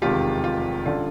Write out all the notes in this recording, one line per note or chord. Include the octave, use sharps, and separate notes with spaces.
F1 E2 C3 D#3 G#3 F4 G4
F4
F#2 D3 G3 F4